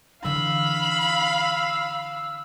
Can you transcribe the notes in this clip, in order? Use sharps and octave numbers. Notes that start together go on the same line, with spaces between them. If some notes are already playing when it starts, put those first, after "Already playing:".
D3 E3 F5 B5 E6